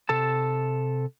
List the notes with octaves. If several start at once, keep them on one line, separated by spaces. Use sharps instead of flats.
C3 A4 A5